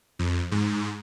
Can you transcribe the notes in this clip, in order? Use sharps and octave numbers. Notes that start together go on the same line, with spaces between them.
F2
G#2